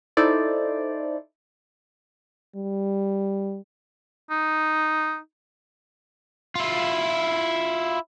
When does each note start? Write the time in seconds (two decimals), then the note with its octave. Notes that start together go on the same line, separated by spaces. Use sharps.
0.17 D#4 E4 A4 C5 D5
2.56 G3
4.30 D#4
6.55 E4 F4